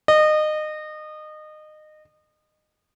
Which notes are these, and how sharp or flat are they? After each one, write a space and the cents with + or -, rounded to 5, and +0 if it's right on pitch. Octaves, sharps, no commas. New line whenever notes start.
D#5 -25